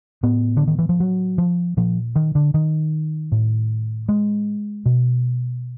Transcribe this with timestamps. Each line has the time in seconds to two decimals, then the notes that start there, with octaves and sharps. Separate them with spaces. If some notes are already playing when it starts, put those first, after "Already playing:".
0.23 A2 B3
0.57 D3
0.68 D#3
0.79 E3
0.89 F3
1.00 F#3
1.38 F3
1.77 A#2 F3
2.16 D#3
2.35 D3
2.54 D#3
3.32 A2
4.09 G#3
4.86 B2